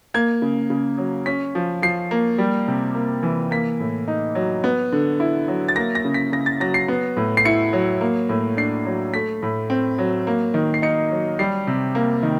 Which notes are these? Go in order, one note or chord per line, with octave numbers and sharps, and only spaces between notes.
A#3 G#6
C#3
C#3
F#3
C#4 B6
F3
F3 C7
A#3
G3
C3
A#3
E3
A#3 B6
A2
D#4
F#3
B3
D3
E4
F#3
A6
A#3 A#6
A#6
C#3
B6
C#3 A#6
A6
F#3 A#6
C7
B3
A2
C7
E4 C#7
F#3
A#3
A2
D4 C7
F#3
A3 B6
A2
C4
F#3
A#3
D#3
C7
D#4 C#7
F#3
G3 C7
C3
A#3
D#3